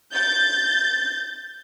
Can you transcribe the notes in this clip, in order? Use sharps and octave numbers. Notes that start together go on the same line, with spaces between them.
G6 A6